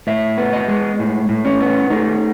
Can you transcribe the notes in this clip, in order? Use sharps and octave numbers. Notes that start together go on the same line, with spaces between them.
A2 E5
B3
D#5
G#3
A2
A2
C#4
B3
A3 D#4